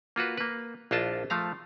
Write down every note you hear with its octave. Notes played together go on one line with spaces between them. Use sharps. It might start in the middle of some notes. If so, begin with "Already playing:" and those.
A#3 F4 F#4 B4
A#3 B4
A#1 D4 E4 F4 D#5 A5
F3 A3 F5 A#5